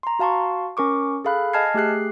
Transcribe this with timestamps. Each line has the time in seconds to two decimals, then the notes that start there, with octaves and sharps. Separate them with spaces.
0.03 A#5 C6
0.19 F#4 F5 A5 C6 C#6
0.77 C#4 A#4 C#6 D6
1.25 G#4 A4 F5 B5 F#6
1.53 D#5 G#5 A5 F6 G#6 C7
1.74 A3 G4 G#4 F#6 C7